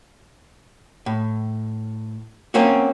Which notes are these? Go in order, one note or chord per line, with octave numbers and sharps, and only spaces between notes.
A2
A#3 C4 C#4 F#4